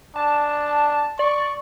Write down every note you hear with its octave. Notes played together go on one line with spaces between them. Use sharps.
D4 A5
D5 C#6